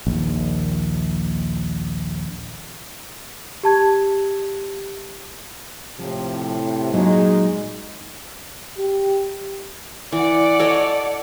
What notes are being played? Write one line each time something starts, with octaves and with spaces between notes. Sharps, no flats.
A#1 D#2
G4 A5 G#6
A2 C3 F3
A#2 F#3 G#3 D#4
G4
E3 D5 F#5
A4 C#5 D#5